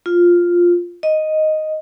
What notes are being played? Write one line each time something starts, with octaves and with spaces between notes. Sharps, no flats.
F4
D#5